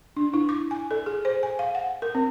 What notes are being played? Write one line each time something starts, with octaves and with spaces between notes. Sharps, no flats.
D4
E4
D6
G#5
A4
G#4
C5
G#5
F5
F#5
A#4
C4